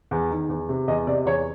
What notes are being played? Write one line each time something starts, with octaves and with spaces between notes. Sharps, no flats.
E2
D#3
E2
C3
E2 D#5
C3 D5
E2 C#5